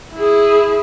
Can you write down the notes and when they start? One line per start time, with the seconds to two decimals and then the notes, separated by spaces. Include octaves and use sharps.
0.13 E4 G#4